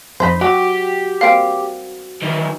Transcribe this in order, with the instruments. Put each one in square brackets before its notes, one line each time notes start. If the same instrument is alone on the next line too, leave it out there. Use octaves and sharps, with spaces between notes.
[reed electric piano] F2 B5 [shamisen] D#4 E4 C5
[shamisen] F#3 [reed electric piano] F#4 [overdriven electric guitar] G4
[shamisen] G3 A#3 C4 [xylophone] F5 G5
[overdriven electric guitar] D#3 E3